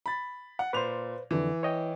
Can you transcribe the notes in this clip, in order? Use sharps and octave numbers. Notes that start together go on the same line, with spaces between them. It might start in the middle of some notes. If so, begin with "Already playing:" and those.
B5 A6
F#5
A#2 B4 C5 F7
F2 D3 E3
C#5 D#5 G5